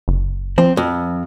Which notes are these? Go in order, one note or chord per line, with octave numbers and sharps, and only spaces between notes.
F#1
F3 C4
F2